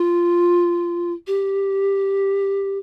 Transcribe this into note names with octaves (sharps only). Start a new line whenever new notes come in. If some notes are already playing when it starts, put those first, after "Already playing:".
Already playing: F4
G4